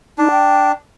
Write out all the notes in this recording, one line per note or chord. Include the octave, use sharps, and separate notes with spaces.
D4 D#4
G5